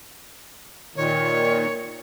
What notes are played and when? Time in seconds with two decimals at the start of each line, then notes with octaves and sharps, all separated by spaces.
0.96 A#2 D#3 C#5